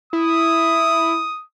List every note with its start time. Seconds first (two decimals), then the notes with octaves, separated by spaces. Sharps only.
0.13 E4 D#6